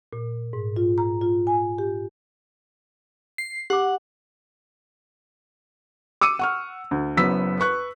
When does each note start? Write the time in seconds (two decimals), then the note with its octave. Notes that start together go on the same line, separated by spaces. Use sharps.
0.13 A#2
0.53 G#2
0.76 F4
0.98 A#5
1.21 F4
1.47 G#5
1.78 G4
3.38 C7
3.70 G4 F#5 D6
6.21 D6 E6 C#7 D#7
6.39 F#5 C#6 F6
6.91 D2
7.17 F#1 F#2 B3 E6 B6
7.60 B4 C#6 F#6